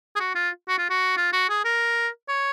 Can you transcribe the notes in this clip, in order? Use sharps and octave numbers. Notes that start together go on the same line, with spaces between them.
G#4
F#4
F4
F#4
F4
F#4
F4
F#4
G#4
A#4
C#5